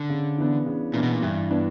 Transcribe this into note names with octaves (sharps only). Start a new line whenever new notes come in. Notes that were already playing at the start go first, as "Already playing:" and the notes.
Already playing: D3
C#3
E3 B3 D4
C#3
A#2 E3 B3 D4
B2
A#2
G2 E3
B3 D4